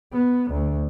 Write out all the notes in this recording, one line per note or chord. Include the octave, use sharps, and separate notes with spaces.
B3
D2